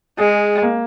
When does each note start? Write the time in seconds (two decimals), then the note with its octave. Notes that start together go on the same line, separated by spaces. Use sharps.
0.18 G#3 G#4
0.62 A#3